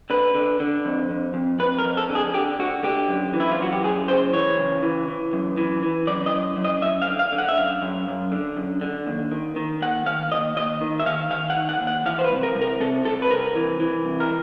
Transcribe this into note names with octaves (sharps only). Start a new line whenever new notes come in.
D3 B4
D3
D3
F2
F2
F2
F2 B4
A#4
F2
A4
D3
G#4
D3 G4
D3 F#4
D3 G4
F#2
E3
E4
F4
F#2 F#4
G4
F#2 G#4
C#3 C5
E3 C#5
C#3
E3
E3
F#2
E3
E3
F#2 D5
D#5
F#2
F#2
D#5
F#2 E5
F5
D3
F5
D3
F#5
E5
F#2 F5
F#2
F#2
D3
F#2
D3
D#2
D#3
D#3
D#2 F#5
D#3 F5
D#2 D#5
D#2 D#5
D#3
E5
D#3 F5
D#3 F5
F#5
D#3
F#5
D#2
F#5
E3 F5
C5
B4
C2
A#4
C2
A#4
C3 A4
C2 A4
B4
C2 A#4
E3
E3
C2
A#4